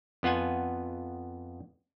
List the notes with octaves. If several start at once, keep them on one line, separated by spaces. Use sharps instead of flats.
F2 B3 F4 F#5 G#5